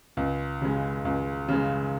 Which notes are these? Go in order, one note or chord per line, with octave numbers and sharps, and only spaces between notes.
C#2
C#3 G#3
C#2
C#3 G#3